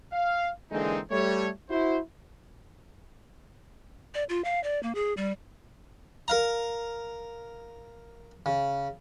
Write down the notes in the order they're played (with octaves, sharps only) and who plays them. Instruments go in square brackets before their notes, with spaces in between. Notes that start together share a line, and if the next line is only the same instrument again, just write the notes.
[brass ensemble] F5
D3 E3 G#3 A#3 C4 D#4
G3 A3 C#5
E4 F#4 C5
[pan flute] D5
F4
F5
D5
A#3
G#4
G3
[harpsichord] A#4 F5 A#5
C#3